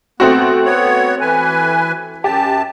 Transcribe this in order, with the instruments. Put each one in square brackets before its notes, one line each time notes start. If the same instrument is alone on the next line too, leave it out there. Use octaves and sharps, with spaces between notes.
[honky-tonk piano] A3 C4 F#4 [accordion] B3
[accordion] B3 C#5
E3 B4 G#5
[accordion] F#2 A5 [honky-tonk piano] G4